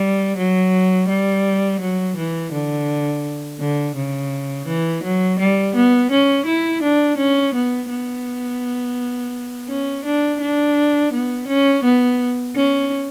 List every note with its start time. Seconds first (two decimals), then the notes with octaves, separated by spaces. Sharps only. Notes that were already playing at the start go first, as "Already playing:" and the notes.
Already playing: G3
0.37 F#3
1.09 G3
1.81 F#3
2.17 E3
2.53 D3
3.60 D3
3.96 C#3
4.67 E3
5.03 F#3
5.39 G3
5.75 B3
6.11 C#4
6.46 E4
6.83 D4
7.18 C#4
7.55 B3
7.90 B3
9.68 C#4
10.05 D4
10.41 D4
11.13 B3
11.48 C#4
11.85 B3
12.56 C#4